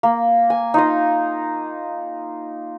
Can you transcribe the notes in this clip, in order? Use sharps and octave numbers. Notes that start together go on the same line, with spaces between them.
A#3
G#5
D#4 F4 D#5